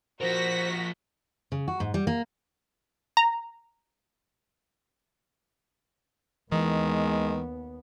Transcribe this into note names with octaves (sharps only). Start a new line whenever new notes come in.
F3 F#4 A#4 C5 A#6 B6
C#3
F#4
G#2
G3
A#3
A#5
D#2 D#3 E3 G#3 B3